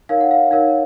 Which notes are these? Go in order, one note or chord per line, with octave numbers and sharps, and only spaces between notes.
D#4 A#4 C#5 F5
F#5
F5
D#4 A#4 C#5 F5